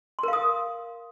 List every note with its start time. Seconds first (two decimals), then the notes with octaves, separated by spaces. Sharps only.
0.19 C6
0.23 A#4
0.28 F5
0.33 D#6